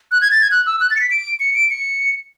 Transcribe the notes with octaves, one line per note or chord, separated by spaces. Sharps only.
F#6
G#6
A6
G#6
F#6
E6
F#6
A6
C#7
B6
D7
C#7
D7
C#7